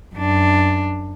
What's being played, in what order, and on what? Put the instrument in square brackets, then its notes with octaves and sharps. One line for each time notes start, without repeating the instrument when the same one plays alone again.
[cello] F#2 D4